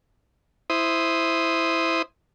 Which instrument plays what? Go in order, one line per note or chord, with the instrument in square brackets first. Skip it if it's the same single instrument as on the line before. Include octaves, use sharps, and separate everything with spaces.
[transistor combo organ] E4 C5 D#6